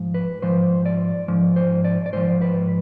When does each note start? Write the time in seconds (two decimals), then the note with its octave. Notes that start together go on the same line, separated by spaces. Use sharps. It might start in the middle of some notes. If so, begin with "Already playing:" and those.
Already playing: G#2 F3
0.14 B4
0.42 G#2 F3 C5
0.86 D5
1.28 G#2 F3
1.56 C5
1.84 D5
2.06 D5
2.13 G#2 F3 C5
2.41 B4